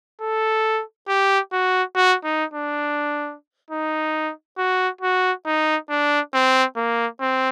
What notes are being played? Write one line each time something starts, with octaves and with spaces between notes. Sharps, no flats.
A4
G4
F#4
F#4
D#4
D4
D#4
F#4
F#4
D#4
D4
C4
A#3
C4